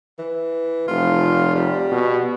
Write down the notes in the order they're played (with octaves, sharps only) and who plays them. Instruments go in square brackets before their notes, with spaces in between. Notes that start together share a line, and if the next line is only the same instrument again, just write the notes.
[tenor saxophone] E3
[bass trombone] F1 [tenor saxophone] F4
[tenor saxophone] G3
[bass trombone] B2